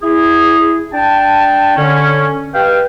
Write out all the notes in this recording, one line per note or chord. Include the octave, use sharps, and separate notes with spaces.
E4 G#4
D4 G5 A5
D3 C#4
G4 B4 D#5 F5 G5